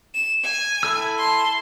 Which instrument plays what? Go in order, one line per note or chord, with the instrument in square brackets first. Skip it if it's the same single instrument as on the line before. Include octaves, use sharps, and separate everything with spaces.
[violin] E7
G#5
[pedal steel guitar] E4 A4 E6
[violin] A5 C6